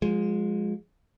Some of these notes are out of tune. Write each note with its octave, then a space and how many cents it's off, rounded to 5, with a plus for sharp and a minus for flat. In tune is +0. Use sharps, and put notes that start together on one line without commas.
F3 +30 G#3 +0